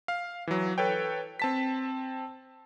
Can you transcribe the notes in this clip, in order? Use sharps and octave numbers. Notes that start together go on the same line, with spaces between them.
F5
E3 F#3
A4 B4 C#5 G5
C4 A5 B6